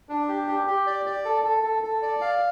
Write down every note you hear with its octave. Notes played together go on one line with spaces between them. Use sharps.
D4
G4
G4
G4
D5
D5
A4
A4
A4
A4
D5
F5